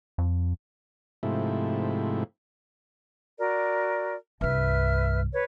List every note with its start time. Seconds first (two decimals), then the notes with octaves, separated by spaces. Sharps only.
0.18 F2
1.23 G#2 C3 F3 A3 E4
3.39 F#4 A#4 D5
4.41 C2 G2 B4 E5 F6
5.33 B4 C#5